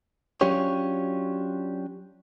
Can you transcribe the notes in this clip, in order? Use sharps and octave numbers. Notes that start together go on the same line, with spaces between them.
F#3 C#4 D4 F4 G4 C#5